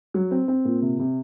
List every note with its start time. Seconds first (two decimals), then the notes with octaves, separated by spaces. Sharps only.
0.14 F#3
0.31 C4
0.48 C4
0.65 A#2
0.82 C3
0.99 C3